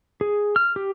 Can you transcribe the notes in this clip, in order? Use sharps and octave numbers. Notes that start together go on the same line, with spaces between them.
G#4
F6
G4